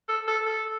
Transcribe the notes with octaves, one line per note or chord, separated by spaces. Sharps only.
A4
A4
A4